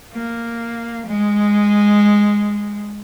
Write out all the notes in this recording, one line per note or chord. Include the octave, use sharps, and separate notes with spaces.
A#3
G#3